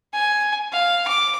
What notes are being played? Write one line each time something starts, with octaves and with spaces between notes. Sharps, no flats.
G#5
F5
D6